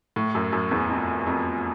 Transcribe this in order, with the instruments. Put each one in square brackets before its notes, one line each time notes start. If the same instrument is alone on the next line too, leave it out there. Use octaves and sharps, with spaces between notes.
[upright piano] A2
F#2
F#2
E2
F2
F2